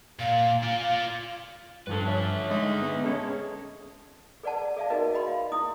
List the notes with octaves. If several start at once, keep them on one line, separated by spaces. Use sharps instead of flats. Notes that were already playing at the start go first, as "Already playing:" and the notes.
A#2 F5
F4 D5
G2 F3 D4 A4 B4
D3 C#4 E5
G#3 D#4
B3
G#3 C#4 A4
G#4 B4 D5 F#5 A5
G#4 D5 E5 F5 A5
D#4 F#4 G#4 A#4 B4 D#5
D#5 G5 B5 C6
F5
E4 D#6